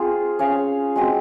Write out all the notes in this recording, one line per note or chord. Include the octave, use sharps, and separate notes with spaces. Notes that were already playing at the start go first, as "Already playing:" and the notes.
Already playing: C4 F4 G#4
C#4 G#4 C#5 F5
G#3 C4 F#4